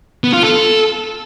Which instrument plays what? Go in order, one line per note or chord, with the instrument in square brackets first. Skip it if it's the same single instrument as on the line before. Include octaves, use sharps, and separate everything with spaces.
[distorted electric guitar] B3
F4
A4